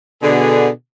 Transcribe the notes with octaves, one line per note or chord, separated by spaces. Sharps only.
B2 D3 G#4